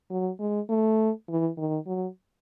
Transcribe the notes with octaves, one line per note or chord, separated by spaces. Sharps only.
F#3
G#3
A3
E3
D#3
F#3